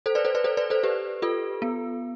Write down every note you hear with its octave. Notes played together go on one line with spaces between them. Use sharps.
A4 C5
B4 D5
A4 C5
B4 D5
A4 C5
B4 D5
A4 C5
G4 B4
F4 A4
B3